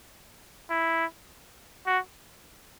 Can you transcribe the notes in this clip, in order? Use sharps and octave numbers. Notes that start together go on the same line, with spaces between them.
E4
F#4